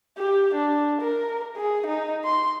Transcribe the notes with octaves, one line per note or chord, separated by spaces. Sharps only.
G4
D4
A#4
G#4
D#4
C6